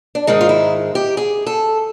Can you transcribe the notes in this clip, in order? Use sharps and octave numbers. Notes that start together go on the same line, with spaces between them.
D4
G#2 D#3 G#3 D#4
F4
E4
G4
G#4
A4